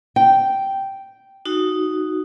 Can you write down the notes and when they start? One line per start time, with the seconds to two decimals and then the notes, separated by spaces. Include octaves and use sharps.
0.16 G5
1.45 D#4 F#4